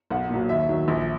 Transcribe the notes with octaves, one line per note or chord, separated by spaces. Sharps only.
B1 F#5
A#2 F#3
D#2 E5
D#3 F#3
A#1